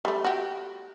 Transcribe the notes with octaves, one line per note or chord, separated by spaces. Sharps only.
G3 A3
F#4 G4